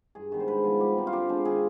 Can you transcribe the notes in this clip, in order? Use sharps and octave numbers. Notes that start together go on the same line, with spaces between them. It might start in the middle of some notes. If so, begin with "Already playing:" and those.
G2 G#4
D#3 G#3 B3
C5
G#2 B4
F3 B3
B2 G4
G3 C4 D#4
F4
D3 G4
G#3 B3 D4
D#3 G#4